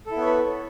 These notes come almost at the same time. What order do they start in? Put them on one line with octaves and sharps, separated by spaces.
A4 E4 B3 C#5 B4